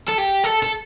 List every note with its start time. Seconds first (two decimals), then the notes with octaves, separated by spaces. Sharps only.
0.09 A4
0.18 G4
0.44 A4
0.63 A4